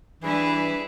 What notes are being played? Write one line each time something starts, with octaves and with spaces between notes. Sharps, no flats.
E3 G3 D4 E4 G#4 B4